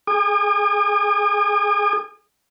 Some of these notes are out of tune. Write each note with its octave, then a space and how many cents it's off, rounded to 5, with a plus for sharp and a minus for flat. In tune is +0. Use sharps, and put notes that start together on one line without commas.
G#4 +25 G#5 -40 D#6 -45